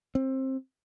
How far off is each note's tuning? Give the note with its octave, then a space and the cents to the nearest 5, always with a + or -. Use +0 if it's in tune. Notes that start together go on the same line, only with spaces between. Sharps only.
C4 +20